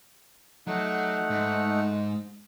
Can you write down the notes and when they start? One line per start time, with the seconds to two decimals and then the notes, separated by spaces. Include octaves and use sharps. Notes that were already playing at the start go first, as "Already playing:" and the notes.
0.67 F#3 A3 D#4 F#5
1.30 G#2